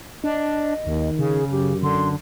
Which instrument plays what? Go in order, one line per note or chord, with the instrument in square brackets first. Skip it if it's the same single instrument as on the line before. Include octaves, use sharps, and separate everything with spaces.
[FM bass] D4 [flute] D#5
[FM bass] D#2 [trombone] D#3
[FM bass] C#3 [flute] G#4
[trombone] F#2 [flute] G4
[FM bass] D3 [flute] C6